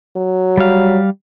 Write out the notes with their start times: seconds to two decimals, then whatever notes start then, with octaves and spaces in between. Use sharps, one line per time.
0.17 F#3
0.57 G3 F5